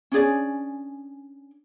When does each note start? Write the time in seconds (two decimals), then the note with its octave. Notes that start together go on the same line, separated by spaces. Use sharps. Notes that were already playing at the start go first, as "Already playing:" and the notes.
0.12 C#4 D4 G#4 D5